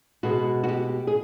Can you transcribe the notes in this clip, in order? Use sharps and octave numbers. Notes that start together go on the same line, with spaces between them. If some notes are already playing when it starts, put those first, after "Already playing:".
B2 G#3 F#4
F#4
G4
G#4